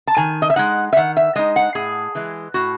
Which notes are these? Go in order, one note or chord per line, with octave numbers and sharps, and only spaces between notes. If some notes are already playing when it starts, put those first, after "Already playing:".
A5
D#3 G#5
D#5
E5
G#3 D#4 F#5
E5
D#3 F#5
E5
G#3 D#4 D#5
F#5
A2 G#4
E3 G#3
A2 F#4